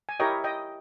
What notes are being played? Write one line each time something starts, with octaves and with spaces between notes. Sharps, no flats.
G#5
E4 G4 A#4 C#5 D#5 G5
D#5 G5